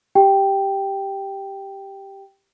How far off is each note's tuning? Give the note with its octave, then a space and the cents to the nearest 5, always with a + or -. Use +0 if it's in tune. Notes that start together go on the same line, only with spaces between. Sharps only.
G4 +0 G5 +0